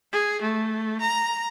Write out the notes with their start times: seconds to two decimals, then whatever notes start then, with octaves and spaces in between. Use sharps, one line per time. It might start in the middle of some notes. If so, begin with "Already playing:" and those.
0.12 G#4
0.42 A3
1.00 A#5